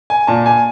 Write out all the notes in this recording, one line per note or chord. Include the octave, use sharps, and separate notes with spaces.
G#5
A#2 A5
G#5